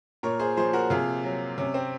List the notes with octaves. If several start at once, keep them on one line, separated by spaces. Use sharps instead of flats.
A#2 A#4 C#5
G#4 C5
F3 G#4 C5
F#4 A#4
C3 F4 G#4
F#3
C3 C#4
C4